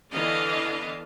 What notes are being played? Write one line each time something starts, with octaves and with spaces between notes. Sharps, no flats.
D3 E3 B3 D4 D#5 F5